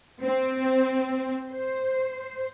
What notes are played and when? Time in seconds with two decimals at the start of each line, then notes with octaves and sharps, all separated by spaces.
0.22 C4
1.50 C5